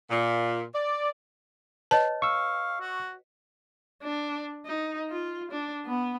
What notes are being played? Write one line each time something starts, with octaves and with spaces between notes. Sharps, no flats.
A#2
D5
B4 C#5 D#5 A5
F5 C#6 E6
F#4
D4
D#4
F4
D4
B3